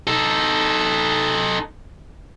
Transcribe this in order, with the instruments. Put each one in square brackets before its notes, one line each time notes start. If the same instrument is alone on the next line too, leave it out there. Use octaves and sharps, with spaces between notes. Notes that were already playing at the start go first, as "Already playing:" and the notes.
[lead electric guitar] D#4 A4